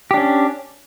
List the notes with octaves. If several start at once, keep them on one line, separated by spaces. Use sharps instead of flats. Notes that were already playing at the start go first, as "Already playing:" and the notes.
C#4 D4 G4